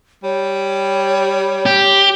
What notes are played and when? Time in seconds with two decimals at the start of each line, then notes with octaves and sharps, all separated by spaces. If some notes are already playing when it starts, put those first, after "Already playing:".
0.24 G3 C#5
1.66 G4